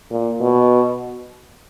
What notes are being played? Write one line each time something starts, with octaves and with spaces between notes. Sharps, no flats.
A#2
B2